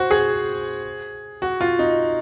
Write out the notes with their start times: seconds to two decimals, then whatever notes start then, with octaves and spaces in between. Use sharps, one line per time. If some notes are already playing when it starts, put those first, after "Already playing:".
Already playing: F#4 C5
0.11 G#4
1.42 F#4
1.61 F4
1.79 D#4